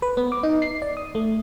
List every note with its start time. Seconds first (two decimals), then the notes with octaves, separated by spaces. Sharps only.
0.02 B4
0.17 B3
0.32 D6
0.43 D#4
0.62 C7
0.82 D5
0.97 D#6
1.15 A3